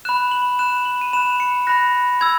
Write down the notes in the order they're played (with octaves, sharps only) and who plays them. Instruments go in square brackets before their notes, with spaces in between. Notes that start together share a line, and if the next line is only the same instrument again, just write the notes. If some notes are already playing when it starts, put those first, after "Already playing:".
[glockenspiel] B5 F#6 E7
F#7
B5 F#6 E7
F#7
D#7
B5 F#6 E7
C#7
B5 F#6 A#6
B5 E6 G#6